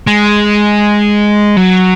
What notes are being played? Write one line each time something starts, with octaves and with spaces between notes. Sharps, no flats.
G#3
F#3